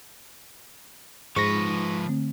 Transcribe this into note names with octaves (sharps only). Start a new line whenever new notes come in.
G#2 F3 B4 C#6 A#6
D3 A3 C4